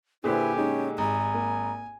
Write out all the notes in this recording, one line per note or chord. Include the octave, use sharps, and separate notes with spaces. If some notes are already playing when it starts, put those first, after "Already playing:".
A#2 D3 E4 G4 G#4 B4 C5 G#5
G#3 C#4 D#4
G#1 G#5 A#5
A#3